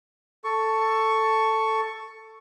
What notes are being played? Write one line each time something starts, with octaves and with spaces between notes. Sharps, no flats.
A4 C#6